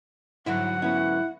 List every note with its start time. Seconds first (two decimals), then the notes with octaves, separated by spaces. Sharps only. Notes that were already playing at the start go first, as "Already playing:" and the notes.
0.46 G#2 D3 F#3 E4 F#5
0.82 B3 C#4 E4